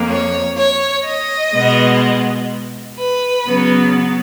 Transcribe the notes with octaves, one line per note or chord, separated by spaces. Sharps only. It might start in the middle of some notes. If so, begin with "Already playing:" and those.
Already playing: F2 F3 A#3
C#5
C#5
D#5
B2 G#3 B3
B4
C#3 F#3 B3